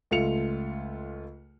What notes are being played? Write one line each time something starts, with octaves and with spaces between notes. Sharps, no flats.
C#2 A3 F4 C#7 F7